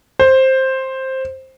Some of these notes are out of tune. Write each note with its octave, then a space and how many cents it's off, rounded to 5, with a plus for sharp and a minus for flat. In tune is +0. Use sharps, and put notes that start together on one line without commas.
C5 +10